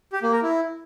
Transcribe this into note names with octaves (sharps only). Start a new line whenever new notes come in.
G4
A#3
A#4
E4